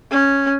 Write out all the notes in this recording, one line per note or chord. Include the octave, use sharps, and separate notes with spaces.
C#4